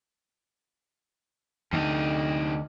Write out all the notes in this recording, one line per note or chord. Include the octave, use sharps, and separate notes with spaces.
D2 C3 D#4